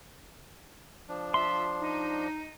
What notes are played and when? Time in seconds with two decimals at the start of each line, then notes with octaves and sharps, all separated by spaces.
1.09 F3 D4
1.34 F4 E5 C6
1.81 D#4